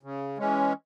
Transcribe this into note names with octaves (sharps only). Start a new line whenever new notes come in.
C#3
E3 G#3 C#4